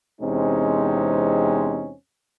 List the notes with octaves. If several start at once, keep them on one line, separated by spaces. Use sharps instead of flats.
E2 C3 G#3 C4 C#4 D#4